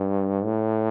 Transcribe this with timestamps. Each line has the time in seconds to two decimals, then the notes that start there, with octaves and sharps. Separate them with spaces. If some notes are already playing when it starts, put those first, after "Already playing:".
Already playing: G2
0.44 A2